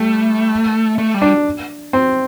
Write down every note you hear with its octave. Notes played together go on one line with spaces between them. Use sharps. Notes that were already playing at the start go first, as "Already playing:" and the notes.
Already playing: G3 A3
A3
G3
D4
C4